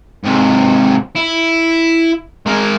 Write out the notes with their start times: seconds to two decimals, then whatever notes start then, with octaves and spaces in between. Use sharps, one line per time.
0.24 G#2 C3
1.16 E4
2.46 G#3 A#4